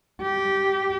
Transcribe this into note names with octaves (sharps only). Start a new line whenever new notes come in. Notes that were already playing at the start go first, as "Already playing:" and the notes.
G4